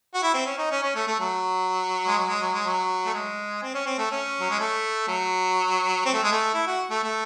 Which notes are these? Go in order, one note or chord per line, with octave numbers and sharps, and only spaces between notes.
F#4
E4
C4
C#4
D#4
C#4
C#4
A3
A3
F#3
G#3
F#3
G#3
F#3
G#3
F#3
A3
G#3
C4
C#4
C4
A3
C#4
F#3
G#3
A3
F#3
C4
A3
G#3
A3
E4
F#4
A3
A3